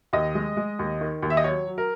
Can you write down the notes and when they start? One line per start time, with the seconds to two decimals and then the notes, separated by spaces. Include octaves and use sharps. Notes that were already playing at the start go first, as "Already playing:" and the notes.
0.13 D#2 D#5
0.35 G#3
0.57 G#3
0.79 D#2
1.01 D#3
1.22 D#2
1.30 E5
1.37 D#5
1.44 F#3 C#5
1.67 F#3
1.78 A#4